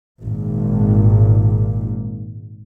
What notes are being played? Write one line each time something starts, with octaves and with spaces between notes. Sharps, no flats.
G#1 A#2